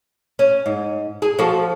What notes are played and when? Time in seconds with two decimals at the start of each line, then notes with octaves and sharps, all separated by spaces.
0.39 C#4
0.66 G#2
1.22 G#4
1.39 F3 F#4 A4